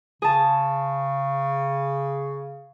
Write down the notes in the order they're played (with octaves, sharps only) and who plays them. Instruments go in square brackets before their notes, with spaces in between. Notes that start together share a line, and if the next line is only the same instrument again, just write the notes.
[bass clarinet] C#3 [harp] G#4 A5